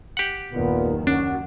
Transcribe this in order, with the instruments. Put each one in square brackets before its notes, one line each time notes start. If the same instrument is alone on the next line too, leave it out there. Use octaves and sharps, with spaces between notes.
[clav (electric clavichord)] G4 F#5
[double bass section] F#1 D#2 D#3 [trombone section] A#2 B3
[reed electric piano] C#4 [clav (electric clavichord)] D4 [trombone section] F#4